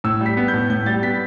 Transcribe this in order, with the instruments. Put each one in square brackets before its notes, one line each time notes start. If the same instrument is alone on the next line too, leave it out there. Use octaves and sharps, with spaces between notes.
[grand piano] A2 E6
G3
B6
B3
G6
A2
A2 G6
G3 A6
B3 B6